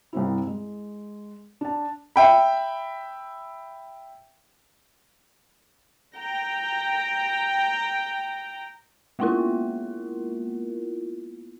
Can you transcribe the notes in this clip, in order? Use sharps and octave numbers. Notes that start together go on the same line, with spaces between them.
C2 G2 C4 E4
G#3
D4 A5
E5 G5 B5
G5 A#5
G#3 A#3 B3 E4 F4 A#4